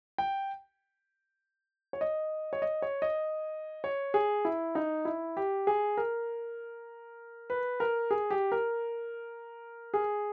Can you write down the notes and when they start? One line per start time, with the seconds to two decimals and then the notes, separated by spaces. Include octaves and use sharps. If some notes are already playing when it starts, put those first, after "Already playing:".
0.18 G5
1.93 C#5
2.01 D#5
2.53 C#5
2.62 D#5
2.82 C#5
3.02 D#5
3.84 C#5
4.14 G#4
4.45 E4
4.75 D#4
5.05 E4
5.37 G4
5.67 G#4
5.97 A#4
7.50 B4
7.80 A#4
8.11 G#4
8.30 G4
8.52 A#4
9.94 G#4